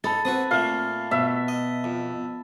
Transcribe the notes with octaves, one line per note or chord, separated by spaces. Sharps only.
D#4 A4 A5 B5 A6
C4 F#4 B4 D#6
A#2 A3 F5
B2 E5
D#5
F2